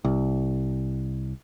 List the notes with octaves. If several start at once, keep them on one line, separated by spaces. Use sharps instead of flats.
C2